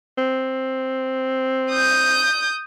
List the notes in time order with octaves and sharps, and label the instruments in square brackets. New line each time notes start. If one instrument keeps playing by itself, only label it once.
[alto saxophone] C4
[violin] D#6 G6